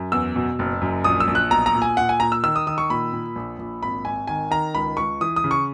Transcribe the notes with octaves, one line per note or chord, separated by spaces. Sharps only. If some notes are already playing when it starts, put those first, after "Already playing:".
Already playing: F#2
E2 E6
B2
F#1
F#2
A#1 D#6
E6
A#1
F#6
B1 A#5
A#5
A#2
G#5
A#2 F#5
G#5
A#2 A#5
E6
D#3 E6
D#6
D#3 D#6
C#6
A#2 B5
A#2
A#1
A#1
G#1 B5
G#1 G#5
D#3 G#5
D#3 A#5
C#2 B5
C#2 C#6
E3 D#6
D#6
C#3
C#6